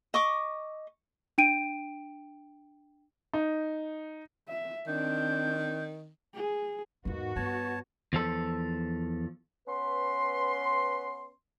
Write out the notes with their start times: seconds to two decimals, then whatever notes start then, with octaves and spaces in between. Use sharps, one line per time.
0.14 D#5 C#6 D6
1.38 D4 G5 D7 D#7
3.34 D#4
4.49 E5
4.87 D#3 C4 D4 G6
6.34 G#4
7.05 E2 G#2 A#3 B3 D#4 F#4
7.36 G2 B3 C#5 A5
8.13 E2 F3 A4
9.68 B3 C#4 B4 C6